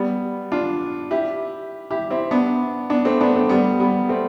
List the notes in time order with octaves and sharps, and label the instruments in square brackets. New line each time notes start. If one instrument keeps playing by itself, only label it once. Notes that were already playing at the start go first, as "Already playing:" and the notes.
Already playing: [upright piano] G3 B3
D4 F4
E4 G4
E4 G4
C4 E4
B3 D4
B3 D4
A3 C4
B3 D4
A3 C4
G3 B3
G3 B3
A3 C4